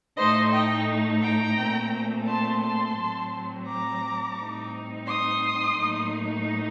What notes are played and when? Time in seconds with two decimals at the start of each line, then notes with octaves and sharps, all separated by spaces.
0.17 A2 A3 D#4 C5 D#5
0.52 D#5 G5
1.22 G5 A#5
1.57 A#2 A3 C4
2.27 A5 C6
2.62 A5 C6
2.97 A2 F#3 C4
3.67 A#5 D6
4.36 A2 G3 C4 D#4
5.07 C6 D#6
5.76 A2 F#3 A#3 D#4